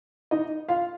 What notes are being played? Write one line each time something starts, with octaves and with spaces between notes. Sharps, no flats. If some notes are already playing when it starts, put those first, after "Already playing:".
D#4 D#5
F4 F5